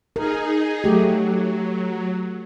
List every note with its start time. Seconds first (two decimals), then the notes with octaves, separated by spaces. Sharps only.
0.16 D#4 G#4 A#4
0.84 F#3 A3 G4